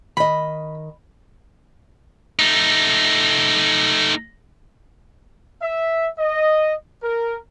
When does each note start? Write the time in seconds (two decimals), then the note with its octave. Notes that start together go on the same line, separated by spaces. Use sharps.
0.17 D#3 D#5 B5
2.39 A3 D#4
5.62 E5
6.19 D#5
7.03 A#4